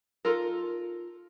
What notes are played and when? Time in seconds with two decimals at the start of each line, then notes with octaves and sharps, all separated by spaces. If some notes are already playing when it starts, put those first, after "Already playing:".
0.25 D#4 F4 A4 A#4